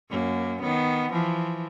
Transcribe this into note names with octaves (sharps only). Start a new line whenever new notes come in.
F#2 A#3
D#3 B3
E3 F3